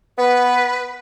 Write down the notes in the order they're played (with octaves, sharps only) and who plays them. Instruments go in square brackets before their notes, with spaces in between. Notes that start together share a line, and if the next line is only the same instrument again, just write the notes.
[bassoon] B3 [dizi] B4